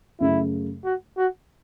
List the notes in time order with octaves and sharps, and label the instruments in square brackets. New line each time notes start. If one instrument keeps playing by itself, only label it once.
[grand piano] F#2 C#3 A3 [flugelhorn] E4
[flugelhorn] F#4
F#4